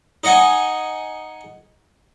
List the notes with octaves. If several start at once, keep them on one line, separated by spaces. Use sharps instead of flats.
D#4 D#5 F#5 G#5